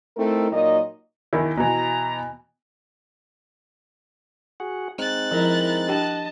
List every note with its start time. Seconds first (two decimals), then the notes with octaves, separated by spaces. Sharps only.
0.17 A3 C4 D#4 E4 A4 A#4
0.52 A#2 F#3 D#4 A#4 D#5
1.33 E2 D#3 E4
1.57 B2 E3 A#5
4.60 F#4 G#4 F#5
4.99 G#3 C4 D#4 F#6 A6
5.31 F3 E4 A#4
5.88 D4 G4 D#5 G5 A5